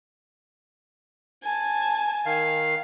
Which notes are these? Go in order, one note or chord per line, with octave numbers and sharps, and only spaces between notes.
G#5 A5
D#3 F5